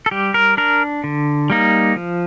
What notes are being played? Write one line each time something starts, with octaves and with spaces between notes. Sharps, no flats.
A4
G3 G4
A#4
D4 A#4
D3
G3 A#3 D#4
F3